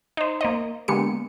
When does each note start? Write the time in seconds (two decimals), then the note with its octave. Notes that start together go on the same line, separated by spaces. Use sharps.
0.17 D#4 C5
0.41 A#3 C5 D#5
0.88 D3 G#3 A#3 B3 G4 C#7